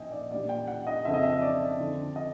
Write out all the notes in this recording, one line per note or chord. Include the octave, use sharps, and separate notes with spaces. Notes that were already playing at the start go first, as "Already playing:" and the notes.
Already playing: A#2 F3 D#5 E5 G5 G#5
D5
A#2 G3 D5
G5
F#5
D#5
F2 C#3 F3 E5
D#5
E5
D#5
D5
F2 D3 F3
D#5